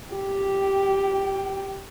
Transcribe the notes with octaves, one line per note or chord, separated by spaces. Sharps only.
G4 G5